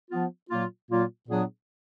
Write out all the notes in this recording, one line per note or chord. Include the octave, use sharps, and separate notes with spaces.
F3 B3 F4
A#2 F#3 A#3 F4
A#2 F#3 A#3 F4
A#2 F#3 B3 D4 G#4